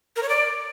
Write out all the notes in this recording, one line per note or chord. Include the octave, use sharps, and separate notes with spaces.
A#4
C#5
D5